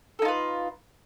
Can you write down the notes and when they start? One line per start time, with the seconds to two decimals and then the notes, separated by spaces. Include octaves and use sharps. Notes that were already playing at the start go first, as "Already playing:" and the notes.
0.19 A4
0.22 D#4
0.25 F4
0.28 B4